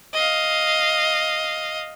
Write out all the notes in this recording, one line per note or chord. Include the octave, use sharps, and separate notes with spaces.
D#5 F5